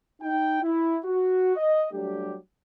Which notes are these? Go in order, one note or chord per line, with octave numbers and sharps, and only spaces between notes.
D#4 G5
E4
F#4
D#5
F#3 G3 A3 D4 G4